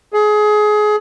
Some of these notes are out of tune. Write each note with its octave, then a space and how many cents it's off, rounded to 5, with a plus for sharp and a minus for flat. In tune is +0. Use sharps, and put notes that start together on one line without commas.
G#4 +25